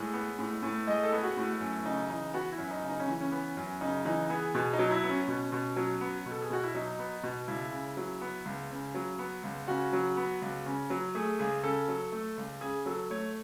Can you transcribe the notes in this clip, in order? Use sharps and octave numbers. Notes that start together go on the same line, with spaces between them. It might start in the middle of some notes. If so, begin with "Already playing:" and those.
Already playing: A2 G#3
B3
A2
A2
G#3 D#5
A4
B3 G#4
F#4
A2
F#2
C#3 D#4
E3 D#4
B3 F#4
E4
F#2
D#4
C#3
D#4
C#4
E3
C#4
B3
F#2
C#3 D#4
E3 D#4
B3 G#4
B2 G#4
D#4
F#3
E4
B3
C#4
B2
B2
F#3
B3
B2
A4
G#4
B2 F#4
E4
F#3 D#4
B3
B2
C#2 E4
C#3
F#3
B3
C#2
C#3
F#3
B3
C#2
C#3 F#4
F#3
B3
C#2
C#3
F#3
A3 G#4
C#2 G#4
C#3 A4
F#3
A3
C#2
C#3 G#4
F#3 A4
A3 C#5